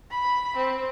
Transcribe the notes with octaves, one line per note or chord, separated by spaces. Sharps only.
B5
C4